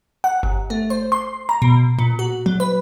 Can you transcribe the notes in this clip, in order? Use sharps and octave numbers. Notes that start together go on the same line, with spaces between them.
F#5
G1
A3
C5
C6
A#5
B2
A#2
F#4
F#3
B4